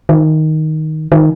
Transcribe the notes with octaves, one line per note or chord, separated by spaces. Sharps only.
D#3
D#3